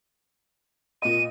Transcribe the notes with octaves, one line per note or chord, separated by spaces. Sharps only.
A#2 D#5 D#7